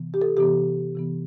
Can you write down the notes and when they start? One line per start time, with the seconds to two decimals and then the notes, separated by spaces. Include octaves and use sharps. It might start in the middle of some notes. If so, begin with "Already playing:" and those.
Already playing: C3 E3 B3
0.14 G4
0.22 A4
0.37 C3 E3 B3 G4
0.96 C3 E3 B3